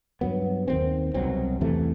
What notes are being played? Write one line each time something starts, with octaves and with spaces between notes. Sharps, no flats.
G2 F#3 B3
D#2 D#3 A3 C4
C2 B2 F#3 C4
E2 C3 E3 A3